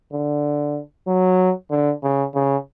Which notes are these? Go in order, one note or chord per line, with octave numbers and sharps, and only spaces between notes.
D3
F#3
D3
C#3
C#3